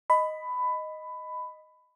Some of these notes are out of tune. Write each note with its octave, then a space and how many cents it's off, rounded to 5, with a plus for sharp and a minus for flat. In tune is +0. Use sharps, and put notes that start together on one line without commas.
D#5 +0 B5 +15